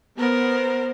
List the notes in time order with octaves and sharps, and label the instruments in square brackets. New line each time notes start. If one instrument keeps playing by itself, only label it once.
[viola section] B3 [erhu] A#4 [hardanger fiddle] C5